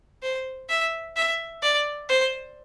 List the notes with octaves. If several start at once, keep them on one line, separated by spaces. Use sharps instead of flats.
C5
E5
E5
D5
C5